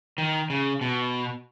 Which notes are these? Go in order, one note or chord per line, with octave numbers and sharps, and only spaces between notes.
D#3
C#3
B2